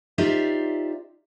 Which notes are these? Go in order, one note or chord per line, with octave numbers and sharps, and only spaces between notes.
D#4 F4 G4 C5 D5 E5